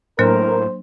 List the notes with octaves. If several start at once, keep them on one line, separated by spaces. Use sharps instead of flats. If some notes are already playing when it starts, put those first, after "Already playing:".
A2 F#3 A#3 D4 A#4 C5